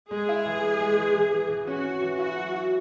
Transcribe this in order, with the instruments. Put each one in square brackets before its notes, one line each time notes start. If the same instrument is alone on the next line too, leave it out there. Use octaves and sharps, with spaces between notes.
[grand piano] G#3 [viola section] G#4
[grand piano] E4
E3
G#3
G#3
E3
E3
E3
E3
[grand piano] C#4 [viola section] F#4
[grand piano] C#4
E3
[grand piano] E4 [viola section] F#4
[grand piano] F#3
E4